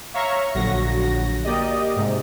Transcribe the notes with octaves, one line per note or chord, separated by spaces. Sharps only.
C#5 E5 F5 A#5 C#6
A#1 D3 F#3 F#4 A#6
A#3 G4 D5 D#5
G#2 C3